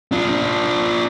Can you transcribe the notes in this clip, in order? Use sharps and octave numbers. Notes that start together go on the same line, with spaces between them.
D4 F4